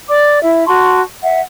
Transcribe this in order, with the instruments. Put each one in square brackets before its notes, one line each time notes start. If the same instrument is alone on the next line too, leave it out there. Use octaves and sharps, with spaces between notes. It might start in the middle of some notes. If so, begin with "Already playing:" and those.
[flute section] D5 D6
E4 E5
F#4 A5 C6 C#6
E5 F#5